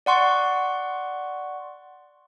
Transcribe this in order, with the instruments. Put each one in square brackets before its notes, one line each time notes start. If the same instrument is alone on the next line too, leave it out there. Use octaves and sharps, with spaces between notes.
[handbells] D5 F#5 C6 C#6